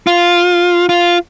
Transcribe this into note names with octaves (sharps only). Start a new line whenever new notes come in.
F4
F4